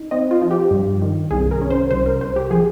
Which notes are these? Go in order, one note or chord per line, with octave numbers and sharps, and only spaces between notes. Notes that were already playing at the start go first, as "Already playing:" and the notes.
Already playing: D#4
C4 D#5
F4
F3
G4
G2
D#3
C2 G#4
A#4
C#4
C5
C2 C5
A#4
C2 C5
G4
F3 G#4